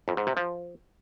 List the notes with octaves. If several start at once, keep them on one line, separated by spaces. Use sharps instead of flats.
F2
G#2
C3
F3